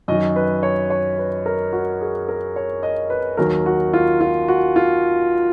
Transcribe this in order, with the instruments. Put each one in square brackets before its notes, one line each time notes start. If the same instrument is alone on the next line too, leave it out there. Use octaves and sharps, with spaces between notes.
[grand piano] F#2 D#3 F#3 D#5
B4
C#5
C#5
B4
A#4
F#4
G#4
A#4
C#5
D#5
B4
D#2 D#3 F#3 A#4
F#4
F4
F4
F#4
F4